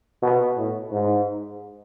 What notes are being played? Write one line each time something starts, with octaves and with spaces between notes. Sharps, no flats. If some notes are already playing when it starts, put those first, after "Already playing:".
B2
A2
G#2